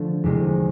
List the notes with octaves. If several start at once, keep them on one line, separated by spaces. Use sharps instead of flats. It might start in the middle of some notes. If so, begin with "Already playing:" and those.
Already playing: D3 F3 A3
E2 C3 D#3 G#3